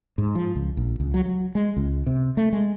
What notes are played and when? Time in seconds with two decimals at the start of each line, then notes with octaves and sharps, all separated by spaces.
0.18 G#2
0.35 F3
0.55 C#2
0.77 A#1
1.00 C#2
1.14 F#3
1.26 F#3
1.55 G#3
1.77 C#2
2.06 C3
2.37 A3
2.53 G#3